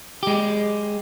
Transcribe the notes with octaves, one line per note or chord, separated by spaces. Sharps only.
G#3 G4